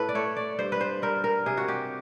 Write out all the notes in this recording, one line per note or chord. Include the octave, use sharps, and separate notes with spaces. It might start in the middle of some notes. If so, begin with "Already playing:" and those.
Already playing: A2 A4 B4
D5
A3 C#5
D5
G2 C5
B4
C5
G3 A#4
A#4
C3 G#4
F#4
G4